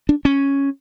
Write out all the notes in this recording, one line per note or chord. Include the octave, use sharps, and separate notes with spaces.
D4
C#4